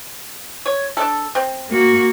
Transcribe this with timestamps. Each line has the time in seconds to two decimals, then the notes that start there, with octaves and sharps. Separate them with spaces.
0.66 C#5
0.97 D4 A4
1.35 C4
1.69 A#3 F#4